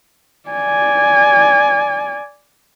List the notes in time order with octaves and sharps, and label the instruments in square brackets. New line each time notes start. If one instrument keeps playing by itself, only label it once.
[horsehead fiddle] D5 G#5